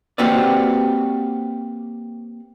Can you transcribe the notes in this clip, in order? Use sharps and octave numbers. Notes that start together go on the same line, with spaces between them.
A#3 C4 F#4 G4 B4 D5